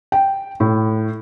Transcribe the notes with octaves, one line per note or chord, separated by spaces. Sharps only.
G5
A2